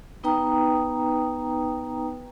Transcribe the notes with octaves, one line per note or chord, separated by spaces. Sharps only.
B3 D#4 B4 G5 A#5 D#6